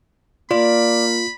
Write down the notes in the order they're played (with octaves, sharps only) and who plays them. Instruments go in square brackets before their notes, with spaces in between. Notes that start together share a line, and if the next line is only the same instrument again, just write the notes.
[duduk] A#3 [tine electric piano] F4 [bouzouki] D5 [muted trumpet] B5